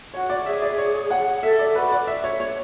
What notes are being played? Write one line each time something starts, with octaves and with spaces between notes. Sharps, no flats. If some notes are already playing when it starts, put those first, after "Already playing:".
F#4 C#5
D5
G#4 E5
D5
C#5
F#5
A4 E5
D5
F#4 B4
D5
E5
C#5
C#5